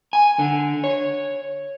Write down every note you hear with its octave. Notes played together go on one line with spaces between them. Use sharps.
G#5
D3
C#5